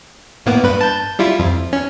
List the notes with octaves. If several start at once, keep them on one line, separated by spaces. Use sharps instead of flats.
A2 A#3 B3
G2 B4
A5 G6
G3 E4 F4
F2
C#4